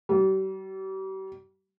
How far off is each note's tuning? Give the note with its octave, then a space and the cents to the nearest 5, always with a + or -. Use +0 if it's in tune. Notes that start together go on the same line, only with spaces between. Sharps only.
G3 -40